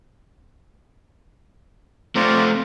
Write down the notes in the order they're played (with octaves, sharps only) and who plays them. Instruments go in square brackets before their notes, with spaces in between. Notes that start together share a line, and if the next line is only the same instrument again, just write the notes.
[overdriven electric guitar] A3 C4 [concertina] F4 D5 A#5